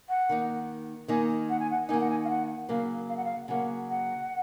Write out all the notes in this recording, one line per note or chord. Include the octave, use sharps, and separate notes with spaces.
F#5
D#3 A#3 D#4
D#3 A#3 D#4 G#5
F#5
G#5
F#5
D#3 A#3 D#4 G#5
F#5
G#5
F5
F#5
C#3 F#3 A#3 F5
F5
F#5
F5
C#3 F#3 A#3 F#5
F#5